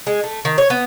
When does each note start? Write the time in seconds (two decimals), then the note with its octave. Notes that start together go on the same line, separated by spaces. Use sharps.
0.07 G#3
0.24 A3
0.45 D#3
0.58 C#5
0.70 B3